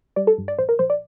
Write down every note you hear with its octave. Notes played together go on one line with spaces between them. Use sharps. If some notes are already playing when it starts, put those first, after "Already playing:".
G3 D5
A4
G2
D5
A#1 C5
A#4
A#1 C5
D5